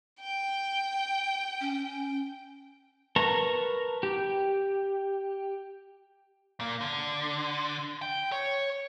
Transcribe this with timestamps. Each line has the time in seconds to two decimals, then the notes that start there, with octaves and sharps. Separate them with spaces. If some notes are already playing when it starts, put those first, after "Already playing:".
0.20 G5
1.61 C#4
3.16 A#4 B4 A5 A#5 C#6
4.03 G4
6.60 A#2 A#3
6.81 D3
8.02 G5
8.32 C#5